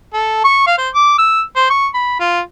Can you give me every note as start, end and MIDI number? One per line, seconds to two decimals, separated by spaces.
0.14 0.43 69
0.44 0.64 85
0.67 0.75 77
0.78 0.89 72
0.94 1.16 86
1.18 1.42 88
1.56 1.69 72
1.70 1.87 85
1.94 2.18 83
2.20 2.40 65